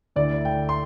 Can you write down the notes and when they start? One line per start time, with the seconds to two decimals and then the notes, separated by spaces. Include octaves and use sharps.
0.16 D2 D3 A3 E4 D5
0.45 G5
0.69 C6